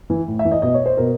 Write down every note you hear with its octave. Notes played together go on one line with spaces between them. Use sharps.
E3
A2
E5
E3
D#5
B2 D#5
C#5
C5
B2 A#4